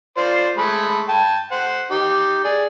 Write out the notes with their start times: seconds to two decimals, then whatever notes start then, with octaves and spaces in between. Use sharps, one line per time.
0.17 F4 C5 D5
0.58 G#3 A3 B5
1.09 G5 A5
1.51 C5 F#5
1.91 D#4 G4
2.44 G#4 D5